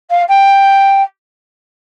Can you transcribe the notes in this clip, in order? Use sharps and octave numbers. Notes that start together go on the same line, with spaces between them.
F5
G5